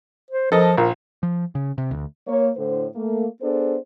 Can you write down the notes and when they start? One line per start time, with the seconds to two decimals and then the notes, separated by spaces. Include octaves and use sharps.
0.31 C5
0.52 F3 A4 A#4 D#5
0.77 A#1 A#4
1.23 F3
1.55 C#3
1.78 C3
1.91 D2
2.28 A#3 C#5
2.57 A2 D3 C5
2.95 A3 A#3
3.42 B3 D4 G#4 A4 C5